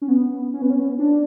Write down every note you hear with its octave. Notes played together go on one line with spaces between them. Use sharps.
C#4
B3
C#4
B3
C#4
D4